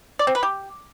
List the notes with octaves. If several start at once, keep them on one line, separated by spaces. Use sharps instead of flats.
D5
C4
B4
G4